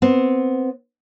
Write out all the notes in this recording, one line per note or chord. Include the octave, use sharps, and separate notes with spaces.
B3 C4